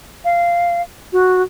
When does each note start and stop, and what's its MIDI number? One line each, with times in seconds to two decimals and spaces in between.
0.25 0.82 77
1.13 1.42 66